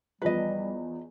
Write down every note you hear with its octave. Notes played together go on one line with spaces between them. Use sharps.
E2 F3 G3 B4 D#5